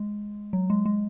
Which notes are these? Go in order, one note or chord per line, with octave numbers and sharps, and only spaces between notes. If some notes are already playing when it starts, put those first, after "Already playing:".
Already playing: G#3
F#3
G#3
G#3